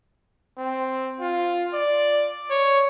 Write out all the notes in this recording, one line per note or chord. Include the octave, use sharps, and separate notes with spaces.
C4
F4
D5
C#5